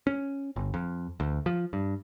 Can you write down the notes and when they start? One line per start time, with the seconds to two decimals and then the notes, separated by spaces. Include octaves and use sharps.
0.07 C#4
0.56 G1
0.74 F2
1.20 D2
1.46 F3
1.73 G2